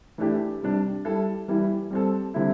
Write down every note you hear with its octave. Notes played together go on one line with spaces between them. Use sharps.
E3 A3 D4 G4
C3 G3 D4
G3 E4 A4
E3 G3 E4
G3 C4 A4
D3 G3 C4 E4